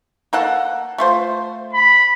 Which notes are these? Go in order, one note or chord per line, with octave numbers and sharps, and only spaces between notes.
A#3 A4 F#5
A3 F4 C5
B5